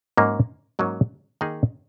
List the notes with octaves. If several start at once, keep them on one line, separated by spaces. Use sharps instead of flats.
G#2 F#3 A#3 C#4
G#2 F#3 A#3 C#4
D#3 A#3 D#4 G#4